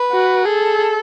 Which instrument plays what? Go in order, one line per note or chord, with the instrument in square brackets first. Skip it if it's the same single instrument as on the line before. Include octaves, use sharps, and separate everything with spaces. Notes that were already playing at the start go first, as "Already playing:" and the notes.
Already playing: [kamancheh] B4
[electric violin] F#4
[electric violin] G#4 [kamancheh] A4